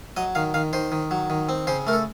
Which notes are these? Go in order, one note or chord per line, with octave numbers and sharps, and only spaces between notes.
F#3 D#5
D#3 F5
D#3 F5
D#3 C5
D#3
F#3
D#3
C4
C#3 C5
A3 A#4
A4